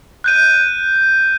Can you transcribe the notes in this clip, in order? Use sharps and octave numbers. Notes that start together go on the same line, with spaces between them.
F#6 G6 D#7